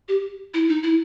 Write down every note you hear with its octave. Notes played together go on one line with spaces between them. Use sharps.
G4
E4
D#4
E4